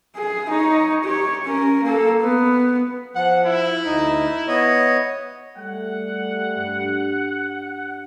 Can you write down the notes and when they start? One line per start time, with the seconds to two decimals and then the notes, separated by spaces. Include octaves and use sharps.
0.16 G#4
0.49 D#4 C#5
1.04 G4 C#5
1.45 C#4 A#4
1.83 A#3 A4
2.22 B3
3.15 F3 F#5
3.46 E4
3.85 D2 D#4
4.47 B3 C#5 D#5
5.57 G3 A3 F#5
6.55 G2 D4